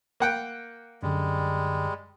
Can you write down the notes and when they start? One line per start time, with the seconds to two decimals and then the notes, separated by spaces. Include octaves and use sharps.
0.20 A#3 F#5 G5
1.03 F#2 D3 G3 G#3